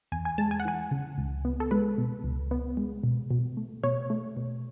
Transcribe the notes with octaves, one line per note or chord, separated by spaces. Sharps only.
E2 G#5
G#5
G#3 A5
G#5
F#5
E3 G#5
C#3
C#2
B3
A4
G#3 B4
B2
C#2
B3
G#3
B2
B2
A3
B2 C#5
A3
B2